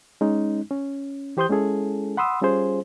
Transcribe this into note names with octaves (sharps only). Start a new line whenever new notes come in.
G#3 C#4 D#4
C#4
E3 G4 C5 C6 D#6 G6
G#3 C#4 E4 G#4 A4
F#5 B5 C6 D#6 E6
G3 C#4 F4 G#4 C5